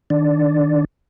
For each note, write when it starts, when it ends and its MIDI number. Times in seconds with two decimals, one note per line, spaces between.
0.10 0.85 51
0.10 0.85 62
0.10 0.85 74